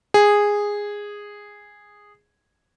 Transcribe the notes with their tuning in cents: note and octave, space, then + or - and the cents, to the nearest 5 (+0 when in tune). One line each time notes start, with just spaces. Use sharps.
G#4 -10